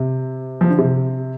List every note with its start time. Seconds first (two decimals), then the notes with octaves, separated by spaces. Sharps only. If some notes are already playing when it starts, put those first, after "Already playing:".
Already playing: C3
0.61 F3
0.70 D3
0.78 C3